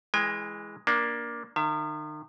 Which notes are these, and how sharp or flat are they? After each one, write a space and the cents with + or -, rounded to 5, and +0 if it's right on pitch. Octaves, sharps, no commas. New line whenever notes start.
E3 +0 G#3 +0 G#5 -45
A#3 +15 D4 +0
D#3 -35 E5 +30